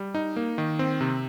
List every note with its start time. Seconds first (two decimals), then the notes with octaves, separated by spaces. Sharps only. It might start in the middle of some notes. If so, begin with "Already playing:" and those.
Already playing: G3
0.15 D#4
0.36 A#3
0.58 D#3
0.79 C4
1.01 C3